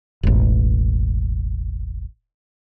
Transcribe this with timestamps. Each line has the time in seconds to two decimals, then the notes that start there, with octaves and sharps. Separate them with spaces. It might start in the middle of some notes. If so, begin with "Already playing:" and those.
0.23 E1 A1